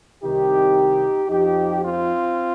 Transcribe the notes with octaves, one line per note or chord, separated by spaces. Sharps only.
C2 C3 D#3 D#4 G4
F2 F3 D#4 G4
C4 F4